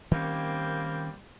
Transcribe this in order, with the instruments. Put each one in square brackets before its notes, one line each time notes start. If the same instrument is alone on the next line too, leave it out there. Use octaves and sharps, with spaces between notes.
[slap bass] D#3 C#4 [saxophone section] G3 A#3 C4